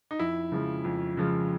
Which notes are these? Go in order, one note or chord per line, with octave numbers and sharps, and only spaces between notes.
D#4
F2 E4
C#3 F3 G#3
F2
C#3 F3 G#3